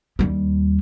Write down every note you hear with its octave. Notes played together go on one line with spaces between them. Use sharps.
D#2 G3